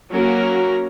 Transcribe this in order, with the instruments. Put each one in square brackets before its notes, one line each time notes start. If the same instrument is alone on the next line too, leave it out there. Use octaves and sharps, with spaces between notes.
[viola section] F#3 A#3 C#4 F#4 A#4